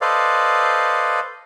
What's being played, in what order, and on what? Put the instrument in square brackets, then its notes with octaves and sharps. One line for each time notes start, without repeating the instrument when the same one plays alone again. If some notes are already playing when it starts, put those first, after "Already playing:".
[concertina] A4 B4 C5 D5 D#5 F5